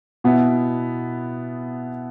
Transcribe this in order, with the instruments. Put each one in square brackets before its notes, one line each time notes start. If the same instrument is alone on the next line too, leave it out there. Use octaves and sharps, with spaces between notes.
[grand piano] B2 B3 E4